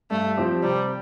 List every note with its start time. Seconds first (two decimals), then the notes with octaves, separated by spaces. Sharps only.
0.11 G2 A3
0.38 F3 C4 G4
0.63 C3 G3